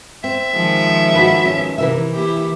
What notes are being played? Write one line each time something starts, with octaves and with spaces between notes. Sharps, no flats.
C4 E5
D#3 F3 G#3
F#4 B4
C#4
C3 E3 A#4 E5
A#3 E4 G4